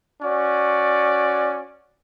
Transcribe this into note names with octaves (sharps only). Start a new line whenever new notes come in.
C#4 F#4 D5